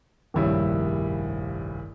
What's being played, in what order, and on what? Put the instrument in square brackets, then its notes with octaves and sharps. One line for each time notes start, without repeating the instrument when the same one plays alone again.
[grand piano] F1 A#1 G2 [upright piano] D#3 E4 C#5